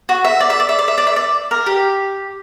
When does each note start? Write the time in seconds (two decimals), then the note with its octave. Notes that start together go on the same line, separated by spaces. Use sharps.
0.09 F#4
0.25 E5
0.40 D5
0.50 E5
0.60 D5
0.69 E5
0.79 D5
0.88 E5
0.98 D5
1.07 E5
1.16 D5
1.51 A#4
1.66 G4